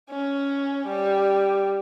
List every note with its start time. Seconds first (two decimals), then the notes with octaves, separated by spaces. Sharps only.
0.10 C#4
0.87 G3